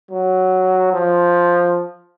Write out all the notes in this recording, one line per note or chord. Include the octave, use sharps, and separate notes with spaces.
F#3
F3